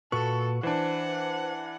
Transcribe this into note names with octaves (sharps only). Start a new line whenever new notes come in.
A#2 F#4 A4 B4 C#6
E3 D4 C5 F#5